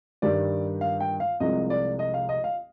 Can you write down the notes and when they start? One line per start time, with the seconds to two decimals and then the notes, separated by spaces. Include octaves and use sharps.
0.22 G2 D#3 G3 D5
0.81 F5
1.00 G5
1.20 F5
1.40 C2 C3 F3 G#3 D#5
1.70 D5
1.99 D#5
2.14 F5
2.29 D#5
2.44 F5